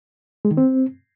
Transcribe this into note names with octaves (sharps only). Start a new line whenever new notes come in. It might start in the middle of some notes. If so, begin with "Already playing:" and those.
G#3
D#3
C4